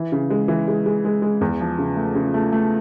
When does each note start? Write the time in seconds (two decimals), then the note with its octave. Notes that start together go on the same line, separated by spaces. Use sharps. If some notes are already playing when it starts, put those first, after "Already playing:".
Already playing: E3
0.12 C#3
0.30 G#3
0.48 E3
0.68 G#3
0.86 G#3
1.05 G#3
1.22 G#3
1.41 E2
1.60 F3
1.79 C#3
1.96 A3
2.15 C#3
2.34 A3
2.53 A3